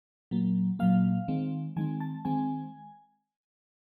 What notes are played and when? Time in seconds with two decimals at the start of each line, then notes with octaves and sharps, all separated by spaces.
0.31 A#2 F#3 A#3
0.79 A#2 F#3 A#3 F5
1.28 D#3 G#3 C4
1.76 D#3 G#3 C4 G#5
2.00 A5
2.25 D#3 G#3 C4 G#5